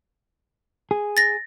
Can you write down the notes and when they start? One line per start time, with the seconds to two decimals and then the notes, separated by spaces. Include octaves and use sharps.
0.91 G#4
1.17 A6 A#6